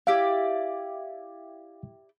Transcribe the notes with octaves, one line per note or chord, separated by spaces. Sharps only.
E4 G4 D5 F5